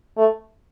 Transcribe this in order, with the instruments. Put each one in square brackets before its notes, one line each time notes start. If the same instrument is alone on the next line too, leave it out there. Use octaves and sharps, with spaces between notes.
[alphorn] A3